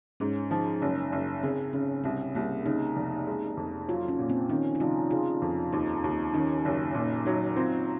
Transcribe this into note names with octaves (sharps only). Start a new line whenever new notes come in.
G#2 C#4
F3 D#4
F#1 C#4
F#1
C#3 C4
C#3 C#4
C2 C4
C2 A#3
C#3 D#4
F1
G#3
F2
F#3 F4
C#4
A#2
C4
D#3 C#4
D#4
F1 F4
C#3 F4
F2
D#2 D#4
D#2
D#3 C#4
F#1
A#2 D#4
F#3 D#4
C4 F4